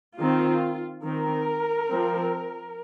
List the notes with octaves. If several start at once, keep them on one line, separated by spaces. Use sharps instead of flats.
D#3 C4 F4
D#3 C4 A#4
F3 C4